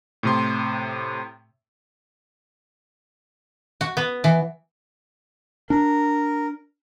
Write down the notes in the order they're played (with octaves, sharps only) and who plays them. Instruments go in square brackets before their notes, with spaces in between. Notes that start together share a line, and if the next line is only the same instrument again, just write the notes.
[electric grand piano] A2 C3 C6
[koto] F#4
B3
E3
[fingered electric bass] D4 [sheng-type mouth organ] A#4